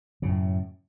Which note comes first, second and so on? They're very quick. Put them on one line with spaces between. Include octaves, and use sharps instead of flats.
C#3 F#2 A2